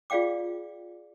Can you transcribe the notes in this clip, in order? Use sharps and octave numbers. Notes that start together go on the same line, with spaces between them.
F4 G#4 D5 F5 G5 D6